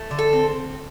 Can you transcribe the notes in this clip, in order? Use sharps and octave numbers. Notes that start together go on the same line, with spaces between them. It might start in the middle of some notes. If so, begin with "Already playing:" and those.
Already playing: A3
D3
A4
C4